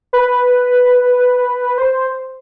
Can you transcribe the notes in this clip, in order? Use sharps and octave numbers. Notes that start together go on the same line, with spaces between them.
B4
C5